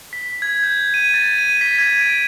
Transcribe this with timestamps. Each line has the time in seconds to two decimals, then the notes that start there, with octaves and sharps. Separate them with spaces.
0.13 B6
0.42 G#6
0.63 G6
0.94 D#7
1.14 A6
1.38 D#7
1.61 B6
1.79 G#6
2.01 D7